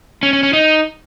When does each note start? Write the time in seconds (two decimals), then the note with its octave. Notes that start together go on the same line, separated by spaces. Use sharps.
0.23 C#4
0.33 C#4
0.43 C#4
0.53 D#4